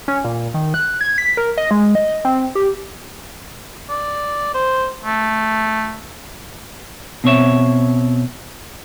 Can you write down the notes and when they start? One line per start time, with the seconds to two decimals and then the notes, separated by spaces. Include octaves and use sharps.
0.08 C#4
0.24 A#2
0.54 D#3
0.74 F#6
1.01 G#6
1.18 B6
1.37 A#4
1.58 D#5
1.71 G#3
1.95 D#5
2.25 C4
2.55 G4
3.90 D5
4.54 C5
5.04 A3
7.24 B2 C4 C#5 E5